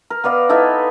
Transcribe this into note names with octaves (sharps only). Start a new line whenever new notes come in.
A#4
B3 A#4 D5 F5
B3 D#4 E4 A4